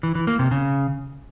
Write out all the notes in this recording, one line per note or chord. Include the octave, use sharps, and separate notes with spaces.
E3
E3
A#3
C3
C#3